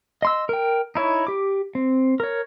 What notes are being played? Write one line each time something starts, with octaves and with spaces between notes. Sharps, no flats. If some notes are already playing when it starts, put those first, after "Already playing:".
D#5 C6 E6
A#4 G5
D#4 E4 C#5
G4 D6
C4
A#4 C#5